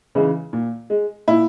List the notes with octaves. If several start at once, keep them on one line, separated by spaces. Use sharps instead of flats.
C#3 E3 G#3
A#2
G#3
A#2 E4